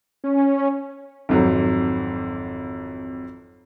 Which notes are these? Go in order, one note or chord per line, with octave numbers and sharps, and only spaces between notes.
C#4
G#1 F2 F#3